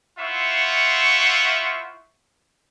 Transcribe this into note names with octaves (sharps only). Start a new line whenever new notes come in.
E4 F4 C5 E5 F#5 C#6